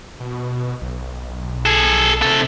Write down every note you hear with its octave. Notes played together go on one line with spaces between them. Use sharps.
B2
B1
G#4 A4
C3 A4